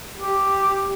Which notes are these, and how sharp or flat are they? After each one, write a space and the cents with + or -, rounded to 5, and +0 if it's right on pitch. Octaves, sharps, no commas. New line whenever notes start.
G4 +0